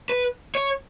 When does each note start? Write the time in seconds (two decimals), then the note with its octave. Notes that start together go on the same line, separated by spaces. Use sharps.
0.09 B4
0.55 C#5